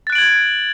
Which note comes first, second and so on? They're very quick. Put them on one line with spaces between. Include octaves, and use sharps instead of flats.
A6 F#6 D7 F#7 G#6